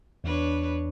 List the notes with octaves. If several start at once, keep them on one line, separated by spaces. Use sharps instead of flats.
E2 D4 B4 C#5